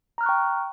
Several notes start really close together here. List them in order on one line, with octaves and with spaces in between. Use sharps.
A#5 F6 F#6 C#6 G5